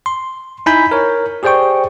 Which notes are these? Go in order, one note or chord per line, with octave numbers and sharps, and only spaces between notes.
C6
D#4 E4 G#5 B5 G6 B6
A#4 C#5
G4 G#4 C5 D5 G5 C#6